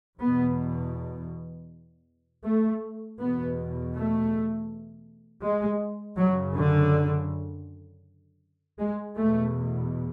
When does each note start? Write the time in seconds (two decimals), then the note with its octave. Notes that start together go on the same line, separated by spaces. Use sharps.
0.21 E2 B2 B3
2.44 A3
3.19 E2 B2 B3
3.94 A3
5.42 G#3
6.17 F#2 C#3 F#3
6.54 D3
8.78 G#3
9.16 E2 B2 A3